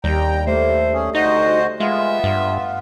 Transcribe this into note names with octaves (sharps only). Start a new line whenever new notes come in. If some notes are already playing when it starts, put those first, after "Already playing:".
D#2 G3 G5 A#5
A2 A3 A#3 C5
C#4 G#4
D2 D#4 F#4 C5 D#5
G#3 B3 F4 E5
G2